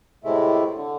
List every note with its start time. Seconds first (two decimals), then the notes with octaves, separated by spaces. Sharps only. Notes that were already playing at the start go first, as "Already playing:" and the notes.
0.24 A2 C3 G#3 A3 E4
0.74 D3